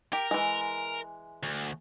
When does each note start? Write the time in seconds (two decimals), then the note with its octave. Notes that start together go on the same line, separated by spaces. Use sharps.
0.13 G4 A#4
0.31 E3 G#3
1.43 D2